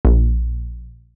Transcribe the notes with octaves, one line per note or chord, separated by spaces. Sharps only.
A#1